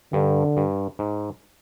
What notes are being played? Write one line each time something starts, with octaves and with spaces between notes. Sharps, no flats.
G2 D3
G2
G#2